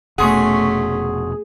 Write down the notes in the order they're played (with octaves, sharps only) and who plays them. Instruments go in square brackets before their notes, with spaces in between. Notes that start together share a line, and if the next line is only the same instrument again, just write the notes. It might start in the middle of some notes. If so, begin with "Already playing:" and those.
[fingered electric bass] F1 B2 [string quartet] A3 C#4 [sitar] G#4 [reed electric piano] F#5 C6 C#6